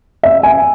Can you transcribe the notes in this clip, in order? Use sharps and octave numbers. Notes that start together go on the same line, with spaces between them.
E5
G#5